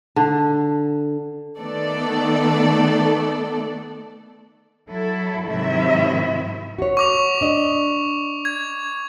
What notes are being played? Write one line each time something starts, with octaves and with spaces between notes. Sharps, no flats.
D3
D#3 A3 B3 A4 D5
F#3 E4 A4
G#2 C3 D#3 F#3 E4 E5
F#4 C#5
C#6 D6 F7
D4 D#5
G#6